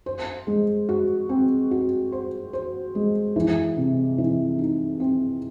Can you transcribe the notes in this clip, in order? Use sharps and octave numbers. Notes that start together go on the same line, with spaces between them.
C5
G#3
F#4
C4
F#4
C5
C5
G#3
E3
C3
E3
D#4
C4